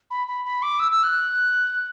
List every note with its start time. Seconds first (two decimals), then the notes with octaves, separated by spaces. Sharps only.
0.10 B5
0.28 B5
0.45 B5
0.62 D6
0.79 E6
0.92 E6
1.03 F#6